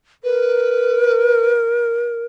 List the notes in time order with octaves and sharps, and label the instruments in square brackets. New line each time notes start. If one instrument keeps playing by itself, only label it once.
[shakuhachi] A#4 [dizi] B4